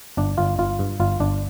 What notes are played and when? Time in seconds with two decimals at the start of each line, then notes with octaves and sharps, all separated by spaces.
0.17 G1 D4
0.38 G1 F4
0.59 G1 F4
0.79 G2
1.00 G1 F4
1.20 G1 D4